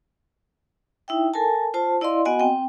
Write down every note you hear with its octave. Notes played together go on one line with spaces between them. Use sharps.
D#4 E4 E5 G5
A4 A#4 G#5 A5
F4 C5 A5
E4 D5 D#5 F5 C6
B3 F#4 D#5 F#5 G#5
C4 G5